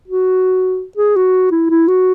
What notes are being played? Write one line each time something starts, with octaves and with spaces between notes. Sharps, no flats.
F#4
G#4
F#4
E4
E4
F#4